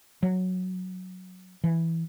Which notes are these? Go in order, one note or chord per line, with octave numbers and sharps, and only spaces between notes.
F#3
E3